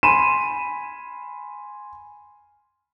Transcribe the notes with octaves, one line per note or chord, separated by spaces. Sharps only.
G#5 B5 C6 D#7 E7